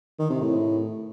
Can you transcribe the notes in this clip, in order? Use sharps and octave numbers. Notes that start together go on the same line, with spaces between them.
D#3
C3
A2